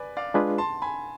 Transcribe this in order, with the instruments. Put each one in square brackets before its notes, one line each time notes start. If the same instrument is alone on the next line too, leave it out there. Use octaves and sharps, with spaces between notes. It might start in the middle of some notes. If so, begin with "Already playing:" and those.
Already playing: [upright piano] B4 D5 G#5
D5 F5
[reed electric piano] G#3 D4 F4 G#4 B4
[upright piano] A5 C6
G#5 B5